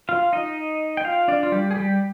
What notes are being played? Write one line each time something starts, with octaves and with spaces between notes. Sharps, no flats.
F4 F5
D#4 D#5
G5
F4 F5
D4 D5
F4
G3 G4
G#4
G3 G4